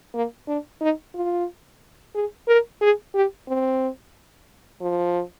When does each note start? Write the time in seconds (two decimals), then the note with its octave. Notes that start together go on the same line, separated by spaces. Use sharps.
0.14 A#3
0.48 D4
0.81 D#4
1.14 F4
2.15 G#4
2.48 A#4
2.81 G#4
3.15 G4
3.48 C4
4.81 F3